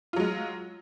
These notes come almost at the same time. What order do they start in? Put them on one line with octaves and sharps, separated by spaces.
F4 F#3 G#3